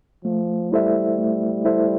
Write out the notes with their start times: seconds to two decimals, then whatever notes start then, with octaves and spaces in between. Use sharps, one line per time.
0.24 F3 A3
0.72 G3 E4 A4 C5 E5
1.18 A3
1.65 E4 A4 C5 E5